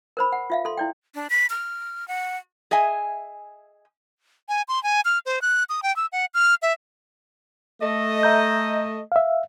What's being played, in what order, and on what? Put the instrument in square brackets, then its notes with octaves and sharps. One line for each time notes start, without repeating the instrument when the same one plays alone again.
[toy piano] A#4 C5 B5
F#5
F4 E5 F5
A4 C6
E4 D5 G5
[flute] D4
B6
F6
F#5
[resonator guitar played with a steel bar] G#4 D#5 E5 G#5
[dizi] G#5
C6
G#5
F6
C5
F#6
D#6
G5
E6
F#5
F6
E5
[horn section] A3 D#5
[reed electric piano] E5 A#5 G6
E5 F5